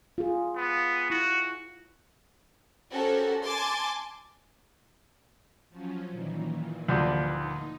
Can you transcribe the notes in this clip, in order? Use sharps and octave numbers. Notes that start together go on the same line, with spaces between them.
F4 G#4
B3
E4 F#4
C#4 F#4 G4 A4 A#4 C5
G#5 A5 C6 D6 A6
F3 F#3 C#4
A#2 D#3 E3
D2 F3 G3
D#4